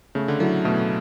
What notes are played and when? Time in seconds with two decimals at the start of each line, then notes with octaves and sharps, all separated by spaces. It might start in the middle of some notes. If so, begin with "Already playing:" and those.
0.15 C#3 A3
0.28 D3
0.40 F#3 E4 A4
0.65 B2 A3